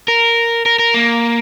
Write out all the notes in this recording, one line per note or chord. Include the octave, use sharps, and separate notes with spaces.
A#4
A#4
A#4
A#3